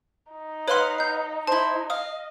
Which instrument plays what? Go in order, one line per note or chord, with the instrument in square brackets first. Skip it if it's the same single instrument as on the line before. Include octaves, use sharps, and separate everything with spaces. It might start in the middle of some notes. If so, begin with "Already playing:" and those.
[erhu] D#4
[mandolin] B4 F5 F#5 [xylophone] C#5 C6
[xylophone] G6 C7
[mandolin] E4 C5 [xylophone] A5
[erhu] D#5 [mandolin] F5 [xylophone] D#6